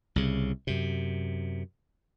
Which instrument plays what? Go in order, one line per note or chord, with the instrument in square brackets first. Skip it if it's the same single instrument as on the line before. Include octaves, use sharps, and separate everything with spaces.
[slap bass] C2 C#3
F#2 C3